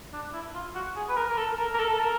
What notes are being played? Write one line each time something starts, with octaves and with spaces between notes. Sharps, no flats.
D4
E4
F4
F#4
G#4
B4
A#4
A#4
A4
A#4
A#4
A4
A4
A#4